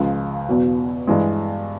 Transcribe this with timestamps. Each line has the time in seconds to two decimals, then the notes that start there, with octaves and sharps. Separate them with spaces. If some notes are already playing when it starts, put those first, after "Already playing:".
Already playing: C#2 C#3 F3 G#3
0.48 E2 B2 F#3
1.07 G2 E3 G#3